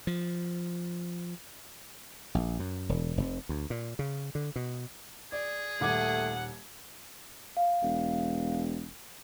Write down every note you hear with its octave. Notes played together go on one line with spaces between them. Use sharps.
F3
A#1
F#2
E1
F1
D2
A#2
C#3
D3
B2
G#4 D5
D#1 A3 F#5 D6 G#6
F5
E1